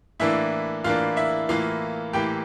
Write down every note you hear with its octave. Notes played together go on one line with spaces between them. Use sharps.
A2 E3 A#3 D4 E4 E5
A2 E3 A#3 D4 F4 F5
E4 E5
A2 E3 A#3 F4 F5
A2 E3 A#3 G4 G5